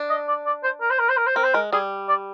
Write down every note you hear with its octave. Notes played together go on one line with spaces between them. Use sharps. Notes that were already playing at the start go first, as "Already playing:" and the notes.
Already playing: D4
D#5
D5
D5
C5
A#4
C5
A#4
C5
A#4
C5
C4 A#4
C5
G#3 A#4
G3 G#4
D5